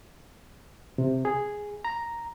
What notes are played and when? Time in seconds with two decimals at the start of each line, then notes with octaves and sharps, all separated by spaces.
0.98 C3
1.25 G#4
1.85 A#5